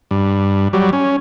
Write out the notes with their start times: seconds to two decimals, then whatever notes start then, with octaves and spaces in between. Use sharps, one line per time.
0.11 G2
0.73 F#3 G3
0.93 C#4